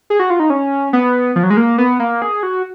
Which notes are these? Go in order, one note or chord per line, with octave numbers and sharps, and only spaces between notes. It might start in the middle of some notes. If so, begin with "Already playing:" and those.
G#4
F#4
F4
D#4
C#4
B3
F3
F#3
G#3
A#3
B3
A#3
G#4
F#4